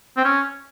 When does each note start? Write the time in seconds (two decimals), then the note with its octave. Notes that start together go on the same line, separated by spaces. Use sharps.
0.17 C4
0.24 C#4